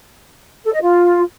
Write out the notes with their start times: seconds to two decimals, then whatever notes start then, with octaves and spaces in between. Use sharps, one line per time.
0.65 A4
0.73 D#5
0.81 F4